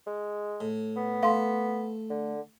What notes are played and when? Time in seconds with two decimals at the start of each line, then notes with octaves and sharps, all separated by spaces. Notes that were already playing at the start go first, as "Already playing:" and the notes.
0.07 G#3
0.60 A2
0.96 B3
1.23 A3 F5 C6
2.10 D3